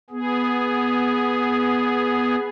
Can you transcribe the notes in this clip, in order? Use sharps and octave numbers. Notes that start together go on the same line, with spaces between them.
B3 G#4